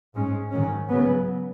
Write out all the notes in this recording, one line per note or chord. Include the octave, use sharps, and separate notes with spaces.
G#2 G#3 C#4
G#2 D#3 F#3 C#4
C#3 F#3 B3